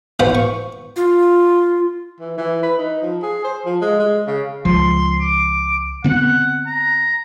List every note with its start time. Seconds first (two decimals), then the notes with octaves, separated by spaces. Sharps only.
0.20 B3 F4 C5 G5 B5
0.35 C#6
0.96 F4
2.20 E3
2.38 E3
2.63 B4
2.79 D#4
3.02 F3
3.22 G#4
3.44 C5
3.65 F3
3.81 G#3
4.00 G#3
4.27 C#3
4.65 C#2 F3 C6
5.20 D6
6.04 D3 B3 C4 F#5
6.66 A#5